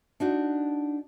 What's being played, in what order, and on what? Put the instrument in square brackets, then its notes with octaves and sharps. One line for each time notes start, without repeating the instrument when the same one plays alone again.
[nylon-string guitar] D4 D#4 F#4